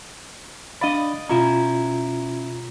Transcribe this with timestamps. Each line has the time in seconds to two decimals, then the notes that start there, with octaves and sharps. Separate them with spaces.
0.81 D4 D5 D#5 F5 B5
1.29 B2 C#4 E4 F4 A#5